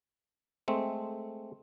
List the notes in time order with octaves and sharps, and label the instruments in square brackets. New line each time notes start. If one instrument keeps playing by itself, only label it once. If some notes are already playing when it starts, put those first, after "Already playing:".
[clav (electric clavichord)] G#3 A3 C4